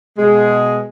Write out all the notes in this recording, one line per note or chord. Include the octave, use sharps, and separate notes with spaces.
B2 G#3